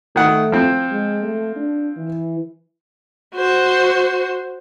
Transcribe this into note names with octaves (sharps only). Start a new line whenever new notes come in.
D#3 A3 F#5
F3 C4
G#3
A3
D4
E3
F#4 C5